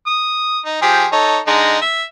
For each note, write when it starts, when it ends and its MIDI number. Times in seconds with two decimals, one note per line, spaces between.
0.07 0.59 87
0.65 0.80 63
0.82 1.06 53
0.82 1.06 67
0.82 1.06 68
1.12 1.39 63
1.12 1.39 69
1.12 1.39 73
1.47 1.77 50
1.47 1.77 56
1.47 1.77 63
1.82 2.03 76